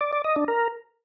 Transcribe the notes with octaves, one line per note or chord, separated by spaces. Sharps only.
D5
D5
D#5
D4
A#4